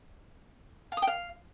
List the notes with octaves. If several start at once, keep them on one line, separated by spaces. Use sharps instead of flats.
F5
D#6
G5
F5